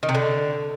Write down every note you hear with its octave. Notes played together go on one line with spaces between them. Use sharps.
D#3
C3
D3